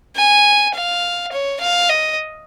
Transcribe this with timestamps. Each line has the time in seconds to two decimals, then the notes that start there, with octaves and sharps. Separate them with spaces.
0.16 G#5
0.74 F5
1.32 C#5
1.60 F5
1.89 D#5